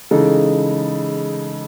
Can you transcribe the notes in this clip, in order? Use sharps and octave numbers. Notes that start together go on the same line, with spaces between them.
C#3 E3 G#3 D#4 A4